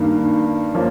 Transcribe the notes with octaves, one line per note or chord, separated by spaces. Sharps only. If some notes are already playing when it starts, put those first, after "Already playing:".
Already playing: G2 D#3 A#3
F3 A#3 C#4